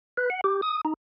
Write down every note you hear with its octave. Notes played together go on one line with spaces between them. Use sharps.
B4
F#5
G4
D#6
D#4